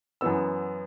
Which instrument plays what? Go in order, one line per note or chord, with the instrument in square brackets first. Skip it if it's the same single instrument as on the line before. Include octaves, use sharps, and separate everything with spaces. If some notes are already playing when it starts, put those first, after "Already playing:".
[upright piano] F#2 E3 B3 E6